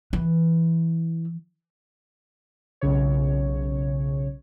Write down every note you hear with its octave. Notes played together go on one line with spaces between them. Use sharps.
E3
B1 C#3 C#5